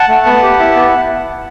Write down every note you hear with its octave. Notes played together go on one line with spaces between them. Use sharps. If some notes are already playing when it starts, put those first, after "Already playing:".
Already playing: F#5 A5
A3
B3
G4
E4
B3